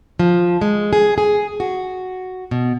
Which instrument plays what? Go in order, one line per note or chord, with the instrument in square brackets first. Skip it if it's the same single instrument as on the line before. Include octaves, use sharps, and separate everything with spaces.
[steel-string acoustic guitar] F3
G#3
G#4
G#4
F#4
B2